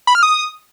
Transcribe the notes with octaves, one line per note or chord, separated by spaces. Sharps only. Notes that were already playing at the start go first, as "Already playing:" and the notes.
B5
F6
D#6